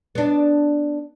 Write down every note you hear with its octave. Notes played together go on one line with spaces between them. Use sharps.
B3 D4